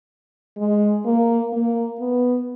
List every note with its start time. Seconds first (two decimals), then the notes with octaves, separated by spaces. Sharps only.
0.57 G#3
1.05 A#3
1.53 A#3
2.00 B3